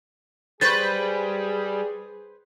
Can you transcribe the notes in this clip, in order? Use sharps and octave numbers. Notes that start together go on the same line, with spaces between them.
G3 G#4 B4 C5 C#6 A6